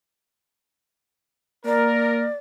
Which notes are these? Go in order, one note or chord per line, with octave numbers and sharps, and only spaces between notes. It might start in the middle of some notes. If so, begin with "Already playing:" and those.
A#3 A#4 D5